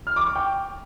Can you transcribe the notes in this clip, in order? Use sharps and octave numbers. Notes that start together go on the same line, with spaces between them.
F6
D6
C#6
G5